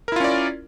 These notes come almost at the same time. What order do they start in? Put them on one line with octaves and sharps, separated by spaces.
A#4 E4 F4 C#4 D5